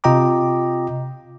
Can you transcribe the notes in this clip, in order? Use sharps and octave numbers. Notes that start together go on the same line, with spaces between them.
C3 F4 D#5 G5 A#5 D6